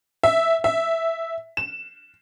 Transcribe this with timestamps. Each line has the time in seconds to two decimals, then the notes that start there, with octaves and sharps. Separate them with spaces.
0.23 E5
0.64 E5
1.57 E7